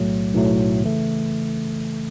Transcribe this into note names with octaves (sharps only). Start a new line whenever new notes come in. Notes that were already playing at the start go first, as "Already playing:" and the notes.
Already playing: B1 A2 F#3 A3
B1 A2 F#3 A3
C#3 E3 A3